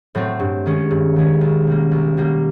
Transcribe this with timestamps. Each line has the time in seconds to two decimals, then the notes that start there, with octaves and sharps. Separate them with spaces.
0.15 A2 F#3 A3 C4
0.40 G2
0.66 D#3 G#3 C#4
0.91 G2
1.16 D#3 G#3 C#4
1.41 B1
1.67 B2 G3 A#3
1.91 B1
2.17 B2 G3 A#3